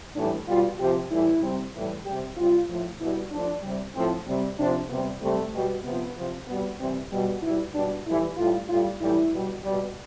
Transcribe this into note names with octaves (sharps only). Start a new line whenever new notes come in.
A2 E3 G3 D4
B2 G3 F4
C3 F3 G4
A2 E3 G3 E4
C3 G3
A2 E3 G3
C3 G3 G4
C3 G3 F4
A2 F3
B2 G3 E4
A2 F3 D4
C3 G3
A2 F3 C4
C3 G3 C4
C3 F3 D4
C3 G3 B3
C3 G3 A3
B2 G3
C3 F3 B3
C3 F3
B2 G3 B3
C3 E3 G3 C4
B2 G3
B2 G3 E4
B2 G3 D4
A2 E3 G3 E4
A2 G3 F4
A2 G3 F4
A2 E3 G3 E4
B2 G3
B2 G3